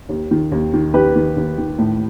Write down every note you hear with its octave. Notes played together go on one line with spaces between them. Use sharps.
D#2
D#3
D#2
D#3
D#3 G4 B4
D#3
D#2
D#3
A2